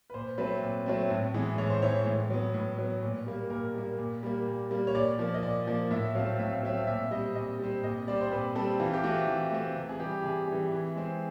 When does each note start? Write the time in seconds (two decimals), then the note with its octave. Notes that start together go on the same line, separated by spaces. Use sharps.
0.10 B4
0.14 A#2 C5
0.38 F#3 A3 C4 B4
0.62 A#2
0.86 F#3 A3 C4
1.10 A2
1.34 E3 G#3 B3
1.58 A2 C#5
1.70 C5
1.82 E3 G#3 B3 C#5
2.07 A2
2.30 F#3 B3
2.54 A2
2.78 F#3 B3
3.03 A#2
3.27 G3 A#3
3.50 A#2 A#4
3.75 G3 A#3
3.99 A#2
4.23 G3 A#3
4.47 A#2
4.71 G3 A#3
4.87 C#5
4.95 A#2 D5
5.19 F3 A#3
5.34 D#5
5.43 A#2 D5
5.67 F3 A#3
5.91 A2 E5
6.15 F#3 A3 C4 F5
6.39 A2 E5
6.52 F5
6.63 F#3 A3 C4 E5
6.78 F5
6.87 A#2 E5
7.11 G3 C4 D#5
7.35 A#2 D#5
7.59 G3 C4
7.83 A#2 D#5
8.07 G3 C4 D5
8.21 C5
8.31 A#2 B4
8.55 G3 C4 A4
8.80 E3 F4
8.93 G4
9.03 A3 C4 F#4
9.28 E3
9.52 A3 C4
9.76 C3
9.89 G#4
10.00 E3 G3 G4
10.24 C3 G#4
10.48 E3 G3
10.72 E3
10.96 G#3 C4